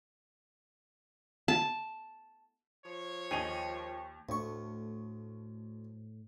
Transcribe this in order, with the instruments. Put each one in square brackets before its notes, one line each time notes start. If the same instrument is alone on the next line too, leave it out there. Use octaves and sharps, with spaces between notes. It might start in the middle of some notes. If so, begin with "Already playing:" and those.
[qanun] A5
[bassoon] F3 [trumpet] C#5
[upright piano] D#2 D#7 F7 [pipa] G#4 A4 D#5
[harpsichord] D2 C#6 [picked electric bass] A2